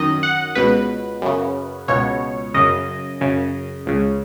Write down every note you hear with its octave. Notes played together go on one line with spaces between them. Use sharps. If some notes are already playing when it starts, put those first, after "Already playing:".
Already playing: F#2 D#3 D#5
F#5
C#2 B2 B4
F#2 C#3
C#2 B2 C#5
F#2 C#3 D#5
F#2 C#3
C#2 C#3